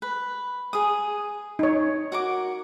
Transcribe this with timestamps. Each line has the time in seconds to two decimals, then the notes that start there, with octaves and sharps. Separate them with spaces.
0.02 B4
0.73 G#4 D#6
1.59 D#4 C#5
2.12 F#4 A#4 D6